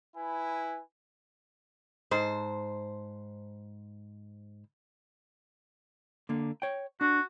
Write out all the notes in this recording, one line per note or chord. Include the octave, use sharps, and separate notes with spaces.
E4 B4 G#5
G#2 C5 A5
D3 A#3
C#5 G5
D4 F#4